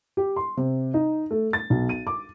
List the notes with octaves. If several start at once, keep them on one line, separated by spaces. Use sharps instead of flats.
G4
C6
C3
D#4
A3
A6
B1
D#7
D6